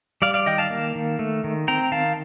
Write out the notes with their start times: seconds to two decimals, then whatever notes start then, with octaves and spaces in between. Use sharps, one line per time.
0.22 G3 D5 F5
0.34 D5 F5
0.46 D#3 D#5 G5
0.58 F5 A5
0.70 A#3
0.95 D#3
1.19 A3
1.44 D#3
1.68 C4 G5 A#5
1.92 D#3 F5 A5